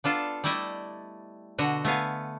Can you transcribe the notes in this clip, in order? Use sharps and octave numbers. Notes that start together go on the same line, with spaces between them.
B3 D4 F4 A4
G3 A3 E4 D5 D#5
B2 D3 F#4 D#5
A3 B3 F5 G#5